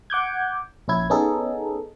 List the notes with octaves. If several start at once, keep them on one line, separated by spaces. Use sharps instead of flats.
F#5 D6 G6 G#6
A#1 C#4 E4 G#6
B3 C#4 D#4 G#4 A4